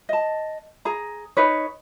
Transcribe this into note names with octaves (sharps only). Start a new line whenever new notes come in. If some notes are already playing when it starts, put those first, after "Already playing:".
D#5 A5
G#4 A#5
D#4 B4 C#5